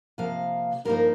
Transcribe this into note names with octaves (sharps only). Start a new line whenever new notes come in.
C3 F3 A#3 F5
G2 F3 A#3 D#4 A#4